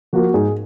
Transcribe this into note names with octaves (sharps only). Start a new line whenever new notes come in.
F3 A#3 F#4
G#2 G#4